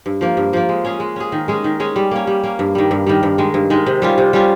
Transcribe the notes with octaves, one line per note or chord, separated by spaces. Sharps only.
G2
F3 A#3
G2
F3 A#3
G#3
C#4 G#4
G#3
C#4 G#4
D#3
G#3 C#4 G#4
D#3
G#3 C#4 G#4
G3
A#3 C#4
G3
A#3 C#4
G2
D#3 G3
G2
D#3 G3
G2
D#3 G#3
G2
D#3 G#3
C3
G3 C#4 F4
C3
G3 C#4 F4